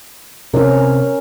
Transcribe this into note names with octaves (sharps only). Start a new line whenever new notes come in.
C3 C#4 A#4